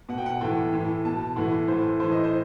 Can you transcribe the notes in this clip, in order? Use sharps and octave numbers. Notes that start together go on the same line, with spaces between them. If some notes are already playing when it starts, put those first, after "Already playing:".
B2 F#5
G5
F#5
A2 E3 G5
A2 E3
B2 A5
A2 E3 F#5
A2 E3 C5
A2 E3 C5
D#5
C5